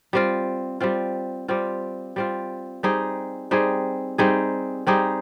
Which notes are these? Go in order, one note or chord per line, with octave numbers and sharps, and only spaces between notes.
G3 C4 F4
G3 C4 F4
G3 C4 F4
G3 C4 F4
G3 C4 D#4 G#4
G3 C4 D#4 G#4
G3 C4 D#4 G#4
G3 C4 D#4 G#4